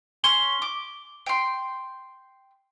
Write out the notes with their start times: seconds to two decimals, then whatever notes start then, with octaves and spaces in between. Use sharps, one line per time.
0.24 C#4 C6 C#6 G7
0.62 D6
1.26 G5 C6